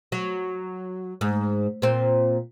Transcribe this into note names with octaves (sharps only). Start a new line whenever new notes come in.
F#3
G#2
A#2 C4